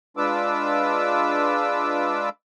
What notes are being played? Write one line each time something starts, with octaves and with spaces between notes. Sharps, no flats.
G#3 D4 F4 B4 D6 E6